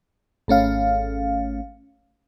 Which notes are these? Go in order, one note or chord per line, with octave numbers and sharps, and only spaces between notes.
G#1 A3 C#4 F5